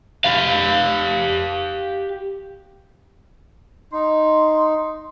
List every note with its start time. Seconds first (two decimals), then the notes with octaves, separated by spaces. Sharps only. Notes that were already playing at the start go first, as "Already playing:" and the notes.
0.24 G4 F5
3.93 D#4 C6